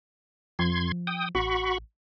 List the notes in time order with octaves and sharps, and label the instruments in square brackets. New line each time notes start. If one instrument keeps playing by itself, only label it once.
[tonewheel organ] F2 C6 G#6 [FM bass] F3
[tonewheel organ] G5 D#6
[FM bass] A1 [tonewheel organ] F#4 B5 C#6